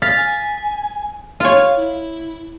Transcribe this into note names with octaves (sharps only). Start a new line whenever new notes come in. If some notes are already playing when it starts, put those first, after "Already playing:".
F5 A6 B6
G#5
F4 C#5 F5
E4